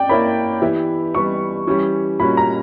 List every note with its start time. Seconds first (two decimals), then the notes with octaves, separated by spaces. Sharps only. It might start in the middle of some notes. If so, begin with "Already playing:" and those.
Already playing: D5 G5
0.09 A#3 E4 A#4 C#5 B5
0.61 E3 B3 E4 G4
1.15 E3 G3 B3 C#6
1.67 E3 G3 C#4 G4
2.19 A#2 G3 A#3 C#4 F#4 B5
2.37 A#5